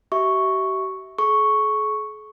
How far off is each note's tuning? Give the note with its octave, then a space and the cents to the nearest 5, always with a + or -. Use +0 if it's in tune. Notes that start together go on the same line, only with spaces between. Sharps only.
G4 -45 E5 -15 C#6 +0
G#4 +45 C#6 +0